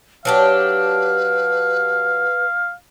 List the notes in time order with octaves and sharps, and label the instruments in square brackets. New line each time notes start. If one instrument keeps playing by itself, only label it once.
[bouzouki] F#3 D4 G4 [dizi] B4 [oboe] F5